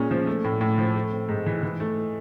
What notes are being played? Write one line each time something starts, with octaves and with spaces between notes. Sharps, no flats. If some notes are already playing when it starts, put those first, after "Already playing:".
Already playing: A#2 G#3 C#4
F3
A3
A2
A2
F3
A3
C4
G#2
E3
E3
A3